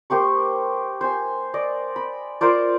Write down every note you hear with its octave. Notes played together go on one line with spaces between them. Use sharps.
A#3 G4 C5 C#6
C5 G#5
D5 D#5
B5
F4 A#4 C5 D5